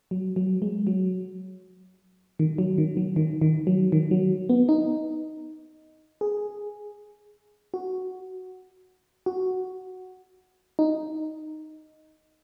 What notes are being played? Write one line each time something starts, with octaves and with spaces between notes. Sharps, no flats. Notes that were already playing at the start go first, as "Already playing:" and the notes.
F#3
F#3
G#3
F#3
D#3
F#3
D#3
F#3
D#3
D#3
F#3
D#3
F#3
B3
D#4
G#4
F#4
F#4
D#4